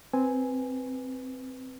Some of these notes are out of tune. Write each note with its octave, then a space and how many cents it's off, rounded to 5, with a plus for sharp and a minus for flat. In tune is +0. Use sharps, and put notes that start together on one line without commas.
C4 +0 B4 +0 G#5 +0